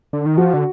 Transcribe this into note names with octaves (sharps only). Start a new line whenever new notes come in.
D3
D#3
F3 F#4
D3